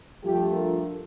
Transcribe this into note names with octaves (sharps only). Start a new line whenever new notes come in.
G2 F3 A3 D4 F4 G4
A#4